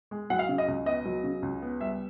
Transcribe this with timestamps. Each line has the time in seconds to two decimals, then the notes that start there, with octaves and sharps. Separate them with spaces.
0.11 G#3
0.30 F#3 F#5
0.39 F5
0.49 C#3
0.58 D#5
0.68 C#2
0.86 B3 D#5
1.05 F#3
1.24 C#3
1.42 C#2
1.62 B3
1.81 G3 E5